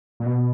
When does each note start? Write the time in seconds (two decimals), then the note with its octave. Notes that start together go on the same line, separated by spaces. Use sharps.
0.20 A#2
0.26 B2